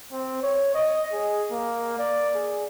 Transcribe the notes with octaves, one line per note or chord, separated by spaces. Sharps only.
C4
C#5
D#5
G#4
A#3
D5
G#4